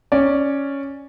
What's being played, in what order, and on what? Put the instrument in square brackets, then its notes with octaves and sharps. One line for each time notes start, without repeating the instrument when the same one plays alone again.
[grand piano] C#4 D5